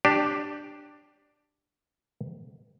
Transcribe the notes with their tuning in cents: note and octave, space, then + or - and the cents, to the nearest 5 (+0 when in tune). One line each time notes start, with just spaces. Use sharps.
D4 +10 G4 +0